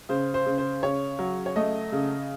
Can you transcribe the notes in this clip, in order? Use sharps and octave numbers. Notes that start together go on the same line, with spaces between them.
C#3 C5
C5
C#3
C5
C#3 C#5
F#3
C#5
A3 D#5
C#3